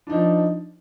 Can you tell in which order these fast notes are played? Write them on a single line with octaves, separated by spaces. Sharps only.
D4 D#4 F3